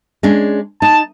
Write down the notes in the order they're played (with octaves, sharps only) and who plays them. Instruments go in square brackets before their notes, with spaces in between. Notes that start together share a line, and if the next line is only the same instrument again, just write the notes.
[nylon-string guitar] G#3 C#4 D4
[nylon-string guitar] D#4 [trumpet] A5